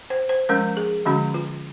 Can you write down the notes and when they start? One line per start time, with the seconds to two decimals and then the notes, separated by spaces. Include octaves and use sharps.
0.10 C5
0.29 C5
0.49 F3 G#3 C#4 A#4
0.77 G#4
1.06 D3 F3 G#3 C#4 F#4
1.34 F4